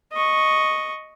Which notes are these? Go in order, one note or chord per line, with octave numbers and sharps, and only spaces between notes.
D#5 C#6